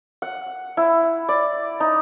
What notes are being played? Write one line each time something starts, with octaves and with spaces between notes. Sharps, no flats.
F#5
E4
D5
D#4